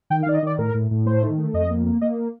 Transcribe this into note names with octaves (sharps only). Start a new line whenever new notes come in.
D#3 G5
F5
D#3 D5
D#5
D#3 D5
A2 A#4
A2
A2
A3 C5
D#3
A3
F2 D#5
A#3
A#3
A#3 D#5